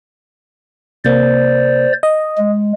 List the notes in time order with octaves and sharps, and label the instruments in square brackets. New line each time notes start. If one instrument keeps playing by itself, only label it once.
[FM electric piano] C3 A#3 [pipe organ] C5 D5
[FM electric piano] D#5
[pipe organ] G#3